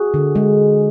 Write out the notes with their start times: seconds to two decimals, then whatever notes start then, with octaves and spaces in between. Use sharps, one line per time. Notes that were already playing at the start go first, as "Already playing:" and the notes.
Already playing: F#4 G#4
0.14 D3
0.35 G#3